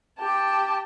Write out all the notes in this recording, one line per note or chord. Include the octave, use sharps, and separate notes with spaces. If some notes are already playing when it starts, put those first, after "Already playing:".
G4 A5